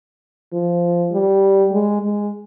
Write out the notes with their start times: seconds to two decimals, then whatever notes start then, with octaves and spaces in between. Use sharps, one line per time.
0.53 F3
1.12 G3
1.72 G#3
2.02 G#3